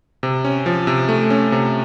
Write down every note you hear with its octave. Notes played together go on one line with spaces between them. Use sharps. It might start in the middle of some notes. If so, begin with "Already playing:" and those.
C3
C#4
F3
C3
A3
C#4
C3